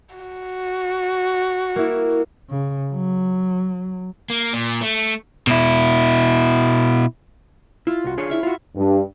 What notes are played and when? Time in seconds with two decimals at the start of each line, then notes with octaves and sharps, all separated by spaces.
0.15 F#4
1.76 A#3 E4
2.50 C#3
2.93 F#3
4.30 A#3
4.53 A#2
4.81 A3
5.47 B2 E4
7.87 E4 F4
8.04 C2 F#4
8.18 D4 G#4 C#5
8.30 E4 E5 F5
8.43 F4 F#4
8.76 G2